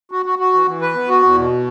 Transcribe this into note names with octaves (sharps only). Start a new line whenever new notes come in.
F#4
F#4
F#4
E3
E3
B4
B3
F#4
E2
B2